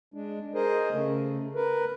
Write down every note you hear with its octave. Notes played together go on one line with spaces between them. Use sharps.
G#3 D4
G#4 A#4 C5 D#5
C#3 A3
A#4 B4